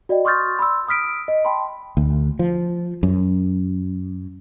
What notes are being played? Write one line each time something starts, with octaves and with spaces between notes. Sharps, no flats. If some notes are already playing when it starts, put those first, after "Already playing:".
F#4 D5 D#5 G5
C6 C#6 D#6 F6 G6 A6
B5 C6 E6
B5 D#6 F6 B6 D7
D#5
G5 A5 B5 C6
D2
F3
F#2